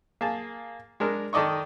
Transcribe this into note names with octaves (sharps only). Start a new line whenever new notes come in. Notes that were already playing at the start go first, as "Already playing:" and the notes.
A#3 G#4 A5
G#3 D4 A#4
D#3 A4 D5 D#5 C#6